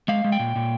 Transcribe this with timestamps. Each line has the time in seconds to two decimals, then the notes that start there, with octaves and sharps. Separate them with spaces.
0.08 G#3 F5
0.24 G#3
0.32 G5
0.39 A#2
0.56 A#2